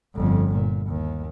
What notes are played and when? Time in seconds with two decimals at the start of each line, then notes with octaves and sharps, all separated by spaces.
0.15 G1 F2
0.53 A#2
0.87 D#2